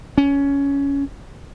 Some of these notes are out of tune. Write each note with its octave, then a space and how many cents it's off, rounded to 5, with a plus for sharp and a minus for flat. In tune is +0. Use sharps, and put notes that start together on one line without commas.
C#4 +15